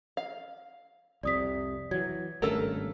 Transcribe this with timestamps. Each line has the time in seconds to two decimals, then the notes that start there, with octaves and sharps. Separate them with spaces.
0.17 F5
1.23 C2 F2 C3 D5 D#6 B6
1.91 E3 F#3 G#6
2.42 G#1 G2 C#3 A3 A4 A#4